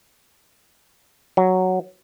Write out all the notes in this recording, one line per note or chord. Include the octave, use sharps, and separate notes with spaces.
F#3